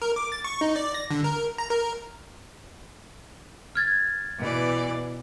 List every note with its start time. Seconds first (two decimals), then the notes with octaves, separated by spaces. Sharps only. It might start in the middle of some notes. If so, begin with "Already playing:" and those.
0.02 A#4
0.16 D6
0.32 A6
0.44 C#6
0.61 D#4
0.76 D5
0.94 A#6
1.11 D3
1.24 A#4
1.58 A#5
1.70 A#4
3.75 F6 G#6 A6
4.38 B2 E3 D5